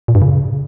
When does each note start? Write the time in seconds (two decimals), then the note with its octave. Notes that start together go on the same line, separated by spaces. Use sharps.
0.08 A#2
0.15 G2
0.22 C#3